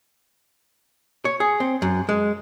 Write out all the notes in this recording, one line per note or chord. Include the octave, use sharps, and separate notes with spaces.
C#5
G#4
C4
F#2
G#3